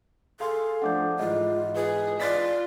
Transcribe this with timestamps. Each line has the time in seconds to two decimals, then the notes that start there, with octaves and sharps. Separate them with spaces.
0.40 G#4 A4 F5 C6
0.82 F3 A3 D4 F#5 D6 G6
1.19 G#2 E3 F4 D#5
1.75 G#4 B4
2.20 F4 D5 F#6 A6 B6